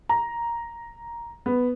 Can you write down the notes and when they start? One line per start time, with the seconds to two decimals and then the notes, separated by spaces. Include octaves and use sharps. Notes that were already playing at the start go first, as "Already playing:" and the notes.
0.09 A#5
1.46 B3